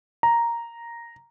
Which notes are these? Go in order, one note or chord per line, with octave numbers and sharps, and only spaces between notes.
A#5